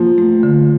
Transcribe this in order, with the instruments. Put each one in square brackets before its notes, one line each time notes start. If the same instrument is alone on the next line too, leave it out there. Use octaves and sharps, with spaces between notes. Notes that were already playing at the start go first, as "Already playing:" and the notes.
Already playing: [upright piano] F3 [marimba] A#3
[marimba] A3
D3